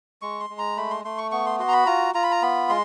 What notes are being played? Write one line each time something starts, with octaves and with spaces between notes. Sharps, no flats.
G#3 C#6
C6
G#3
A#5
A3 B5
C6
A3 C6
C#6
B3 C#6
C6
F#4 C6
A#5
B5
F4 A#5
F4 A#5
B5
A#5
B3 B5
G#3 C6